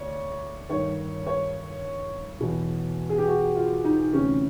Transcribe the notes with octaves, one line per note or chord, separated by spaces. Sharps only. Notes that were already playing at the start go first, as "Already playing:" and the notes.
Already playing: D2 C#5 D5
G2 D#3 C#5
C#5
E2 B2
G#4
G4
F#4
F4
D#4
D2 C3 E3 C#4